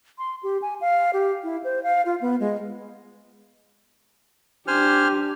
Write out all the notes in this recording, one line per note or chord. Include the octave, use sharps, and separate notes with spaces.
C6
G4
G#5
F5
G4
E4
C5
F5
F4
B3
G#3
D4 G4 C5 G#5 F6